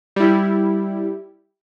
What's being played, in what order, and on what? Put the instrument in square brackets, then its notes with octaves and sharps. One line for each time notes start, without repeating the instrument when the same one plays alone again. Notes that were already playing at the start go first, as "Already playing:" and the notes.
[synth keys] G3 E4